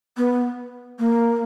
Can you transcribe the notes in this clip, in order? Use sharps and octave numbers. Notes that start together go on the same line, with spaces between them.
B3
A#3